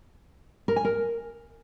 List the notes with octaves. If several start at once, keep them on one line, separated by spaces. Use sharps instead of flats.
A#4
G#5
A#4